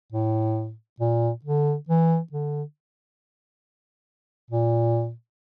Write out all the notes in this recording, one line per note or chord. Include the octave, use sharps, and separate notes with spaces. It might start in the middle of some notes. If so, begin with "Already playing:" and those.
A2
A#2
D3
E3
D3
A#2